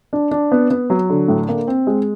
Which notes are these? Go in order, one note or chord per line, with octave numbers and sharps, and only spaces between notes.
D4
D4
B3
B3
F#3
D3
A2
A#3
C4
G#3